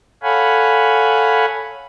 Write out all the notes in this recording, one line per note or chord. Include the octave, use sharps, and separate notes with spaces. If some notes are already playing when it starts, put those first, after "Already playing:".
A4 C#5 F5 F#5 G#5 B5